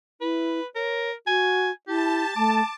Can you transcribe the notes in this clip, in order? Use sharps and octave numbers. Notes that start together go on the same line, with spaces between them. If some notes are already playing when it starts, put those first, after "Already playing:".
E4 B4
A#4 C#5
F#4 G#5
E4 G4 A5
A3 D6